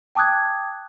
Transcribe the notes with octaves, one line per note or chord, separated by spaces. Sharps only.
G5 A5 D6 D#6 F#6 G#6